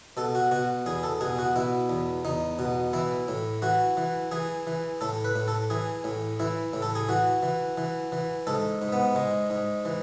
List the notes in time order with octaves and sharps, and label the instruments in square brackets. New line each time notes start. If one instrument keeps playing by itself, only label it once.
[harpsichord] B2 A4
F#4
B2 F#4
E2 G#4
A4
B2 G#4
F#4
B2 E4
E2
E2 D#4
B2
E3 E4
A2
E3 F#4
E3
E3 G#4
E3
A2 A4
B4
A2
A4
E3 G#4
A2
E3 E4
A2
A4
G#4
E3 F#4
E3
E3
E3
G#2 A4
G#2
B3
G#2 G#3
G#2
E3